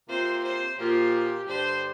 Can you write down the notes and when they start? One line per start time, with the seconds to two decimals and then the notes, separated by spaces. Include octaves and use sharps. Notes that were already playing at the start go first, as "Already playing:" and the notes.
0.09 C3 A#3 F4 C5
0.43 C5
0.78 A#2 F3 A#3 F4 G4
1.47 G2 D3 G3 D4 C5